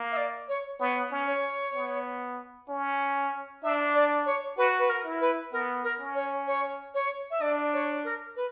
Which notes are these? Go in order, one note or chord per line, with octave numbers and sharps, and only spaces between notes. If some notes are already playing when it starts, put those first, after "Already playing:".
Already playing: A#3
E5
D5
C#5
B3 C#5
C#4
C#5
B3
C#4
D4 E5
D5
C#5
F#4 B4
B4
A#4
E4
B4
B3 A#4
A#4
C#4
C#5
C#5
C#5
E5
D4 D5
C#5
A#4
B4